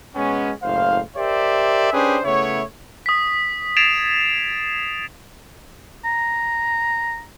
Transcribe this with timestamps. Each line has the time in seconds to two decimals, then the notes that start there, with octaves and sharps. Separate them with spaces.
0.16 B2 G#3 B3 C#4
0.63 F#1 A2 C5 F5
1.17 G4 A#4 C5 D5 E5
1.93 C#4 D4 G4 G#4 B4 C5
2.25 C#3 A3 B3 E4 C#5
3.06 D#6 B6
3.76 G#6 A6 C7 D7 E7 F7
6.05 A#5